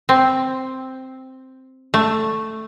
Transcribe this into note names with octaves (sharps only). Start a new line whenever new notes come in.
C4
A3